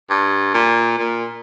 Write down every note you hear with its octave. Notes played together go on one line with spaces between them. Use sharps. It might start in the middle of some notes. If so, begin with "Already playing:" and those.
G2
A#2
A#2